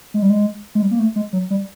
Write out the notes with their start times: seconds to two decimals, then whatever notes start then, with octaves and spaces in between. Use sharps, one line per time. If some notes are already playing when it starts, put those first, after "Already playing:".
0.14 G#3
0.22 G3
0.30 G#3
0.75 G#3
0.82 G3
0.91 A#3
0.99 A3
1.16 G#3
1.33 F#3
1.50 G3